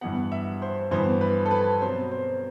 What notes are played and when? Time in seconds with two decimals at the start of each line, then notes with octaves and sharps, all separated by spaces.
0.01 G2 E3 B3 F#5
0.32 E5
0.62 C5
0.91 G2 E3 B3 C5
1.21 B4
1.46 A4
1.51 B4
1.81 B2 F#3 C4 C5
2.11 C5